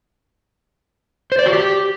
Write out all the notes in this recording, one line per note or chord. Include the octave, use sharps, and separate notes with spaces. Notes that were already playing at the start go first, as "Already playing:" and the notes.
C5
D5
F#4
G4